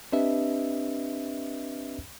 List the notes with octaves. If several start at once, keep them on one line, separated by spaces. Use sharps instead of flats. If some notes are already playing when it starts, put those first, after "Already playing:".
C4 D4 G4 B4 D#5 E5